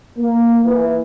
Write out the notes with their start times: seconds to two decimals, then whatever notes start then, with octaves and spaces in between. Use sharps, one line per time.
0.18 A#3
0.64 E3